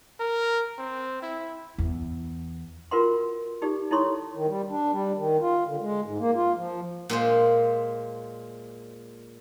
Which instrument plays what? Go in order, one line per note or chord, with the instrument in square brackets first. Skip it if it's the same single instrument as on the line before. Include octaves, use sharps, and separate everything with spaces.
[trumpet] A#4
C4
E4
[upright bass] E2
[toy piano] F4 F#4 A#4 B4 F#5 C6
D#4 G4 G#4 D5
D#4 E4 A4 C#5 C6 C#6
[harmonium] D#3
G3
D4
G3
D#3
F4
D3
G#3
G#2
A#3
F4
F3
[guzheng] A#2 G#3 C5